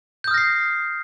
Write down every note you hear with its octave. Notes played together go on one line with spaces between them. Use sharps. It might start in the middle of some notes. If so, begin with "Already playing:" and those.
D#6 F6 G6 A#6 C7